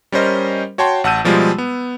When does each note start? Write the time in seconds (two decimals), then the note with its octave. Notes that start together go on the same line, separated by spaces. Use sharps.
0.12 G3 C#4 A#4 C5 D#5
0.78 F#4 C#5 G5 A5 C6
1.04 A1 F#5 A5 E6 G6 D#7
1.24 B2 F3 G3 G#3 F4
1.58 B3